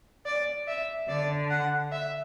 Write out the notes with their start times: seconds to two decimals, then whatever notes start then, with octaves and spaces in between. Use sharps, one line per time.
0.26 D5
0.68 E5
1.09 D3 D5
1.50 F#5
1.92 E5